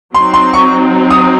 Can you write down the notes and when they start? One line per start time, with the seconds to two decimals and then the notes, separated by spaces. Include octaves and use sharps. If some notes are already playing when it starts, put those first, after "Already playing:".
0.14 F#3 C4 D#4 C6
0.34 C6
0.53 C#6
1.10 D#6